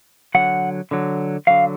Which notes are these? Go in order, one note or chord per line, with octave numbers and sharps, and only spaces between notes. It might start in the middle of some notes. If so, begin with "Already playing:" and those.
D3 F#3 F#5
D3 F#3
D3 F#3 F5